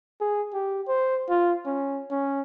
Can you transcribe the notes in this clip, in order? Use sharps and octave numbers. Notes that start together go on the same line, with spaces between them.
G#4
G4
C5
F4
C#4
C#4